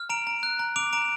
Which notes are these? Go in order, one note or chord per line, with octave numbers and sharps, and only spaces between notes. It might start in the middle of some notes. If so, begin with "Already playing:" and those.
Already playing: F6
A#5 D7 F7
A#5
F#6
A#5
D6 D7 F7
A#5 D7 F7